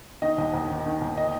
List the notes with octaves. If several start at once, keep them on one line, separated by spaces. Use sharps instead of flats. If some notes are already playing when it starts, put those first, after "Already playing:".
D#3 D#5
D#2
D#2
D#3
D#3
D#2
D#5